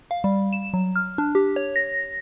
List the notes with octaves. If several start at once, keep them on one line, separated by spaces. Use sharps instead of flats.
F5
G3
E7
F#3
F6
D4
G4
C#5
A#6